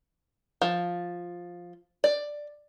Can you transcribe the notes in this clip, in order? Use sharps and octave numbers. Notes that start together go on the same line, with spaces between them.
F3
D5